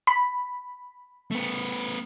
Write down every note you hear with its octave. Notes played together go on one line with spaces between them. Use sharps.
B5
A3 B3